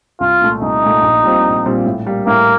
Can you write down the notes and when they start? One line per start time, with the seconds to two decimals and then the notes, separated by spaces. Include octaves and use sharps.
0.20 C2 F4
0.41 A#2 A3
0.61 C2 D#4
0.83 A#2 A3
1.03 A#1
1.23 A#2 G3 C4 F4
1.45 A#1
1.65 A#2 G3 C4 F4
1.86 A2
2.07 G3 A#3
2.27 A2 A#3